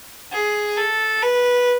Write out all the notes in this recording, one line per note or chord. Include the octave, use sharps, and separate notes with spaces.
G#4
A4
B4